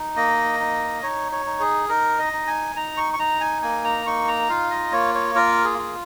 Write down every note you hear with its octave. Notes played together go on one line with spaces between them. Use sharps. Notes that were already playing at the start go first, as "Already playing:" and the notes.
Already playing: D#4
A#3 D#5
D#4
D#4 C#5
C#5
D#4
G#4
D#4 A#4
D#5
D#4
G#5
D#4 A#5
C#6
C#6
D#4 A#5
G#5
A#3 G#5
A#5
D#4 C#6
A#5
F4 F5
D#5
A#3 C#5
C#5
F4 A#4
G#4
F4